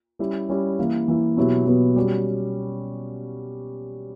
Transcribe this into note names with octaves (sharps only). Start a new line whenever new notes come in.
G3 C#4 E4 G4
G3 C#4 E4 G4
E3 A#3 E4
E3 A#3 E4
B2 F#3 B3 E4 G4
B2 F#3 B3 E4 G4
G3 C#4 F#4